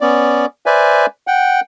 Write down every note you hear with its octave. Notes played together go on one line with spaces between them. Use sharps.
B3 C#4 D5
B4 C5 D5 E5 G#5
F#5 G5